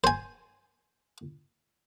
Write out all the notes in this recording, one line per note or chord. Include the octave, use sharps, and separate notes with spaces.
C5 G#5